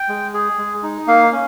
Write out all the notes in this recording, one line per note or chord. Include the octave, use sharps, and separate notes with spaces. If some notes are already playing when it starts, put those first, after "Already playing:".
Already playing: G5
G#3
G#4
G#3
D#4
A#3 F5
C#4